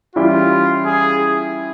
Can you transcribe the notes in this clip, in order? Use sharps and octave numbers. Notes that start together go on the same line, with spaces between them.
E3 G3 C#4 E4 F4 G4
G#4